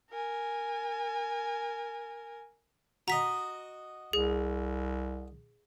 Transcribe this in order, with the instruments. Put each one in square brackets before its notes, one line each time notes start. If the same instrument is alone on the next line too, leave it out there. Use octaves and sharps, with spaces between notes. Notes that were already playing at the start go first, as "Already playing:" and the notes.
[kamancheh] A#4 G#5
[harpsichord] F#4 D#5 [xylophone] A#5 B6
[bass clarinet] C2 [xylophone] G#4